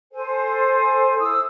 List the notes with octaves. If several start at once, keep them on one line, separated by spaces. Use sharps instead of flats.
A4 C5 G#5
E4 D#6 E6